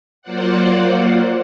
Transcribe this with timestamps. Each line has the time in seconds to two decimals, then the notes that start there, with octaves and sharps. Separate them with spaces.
0.22 F#3 A#3 F4 C5 D5 F#5